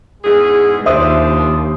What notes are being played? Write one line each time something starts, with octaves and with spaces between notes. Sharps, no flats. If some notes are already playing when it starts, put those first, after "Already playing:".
E2 G#2 G#3 G#4
D#2 F3 G3 D4 C5 E5 D#6